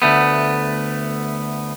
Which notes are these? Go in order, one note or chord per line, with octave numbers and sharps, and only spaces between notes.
D2 A3 B3